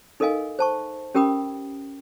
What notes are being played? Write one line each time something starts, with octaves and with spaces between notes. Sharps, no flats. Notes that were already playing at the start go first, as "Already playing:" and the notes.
D#4 A4 A#4 D#5 F5 G#5
C5 A5 C#6
C#4 G4 A#4 G5 B5 D#6